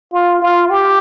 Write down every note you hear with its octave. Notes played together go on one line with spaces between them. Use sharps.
F4
F4
G4